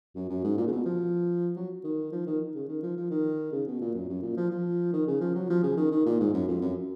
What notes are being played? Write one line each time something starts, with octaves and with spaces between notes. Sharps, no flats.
F#2
F#2
G#2
A#2
C#3
B2
F3
F#3
D#3
F3
D#3
C#3
D#3
F3
F3
D#3
C#3
B2
A#2
F#2
F#2
A#2
F3
F3
D#3
C#3
F3
F#3
F3
C#3
D#3
D#3
A#2
G#2
F#2
F2
F#2